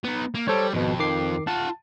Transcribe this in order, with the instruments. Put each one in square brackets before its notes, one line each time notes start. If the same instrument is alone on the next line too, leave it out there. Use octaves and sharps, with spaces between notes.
[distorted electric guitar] B3 D#4
A#3
[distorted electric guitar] G3 [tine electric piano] A4 C5 C#5
[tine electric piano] G#1 B2 [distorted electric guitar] F2
[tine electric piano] D#3 D6 C7
[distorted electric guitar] F4 F#5 [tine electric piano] A5